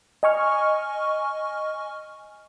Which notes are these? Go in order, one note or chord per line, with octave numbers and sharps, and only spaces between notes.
D#5 G#5 C#6 F6